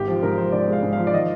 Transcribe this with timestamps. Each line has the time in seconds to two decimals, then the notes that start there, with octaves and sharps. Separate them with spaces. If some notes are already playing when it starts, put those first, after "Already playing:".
Already playing: G#1 G4
0.08 F3
0.23 G#2 A#4
0.38 F3 C5
0.52 G#2 D5
0.68 G#3 F5
0.83 G#2
0.93 F3 F5
1.07 D5
1.13 D#3 D#5